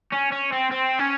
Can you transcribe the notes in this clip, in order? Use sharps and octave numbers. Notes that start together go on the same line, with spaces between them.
C#4
C#4
C4
C4
C#4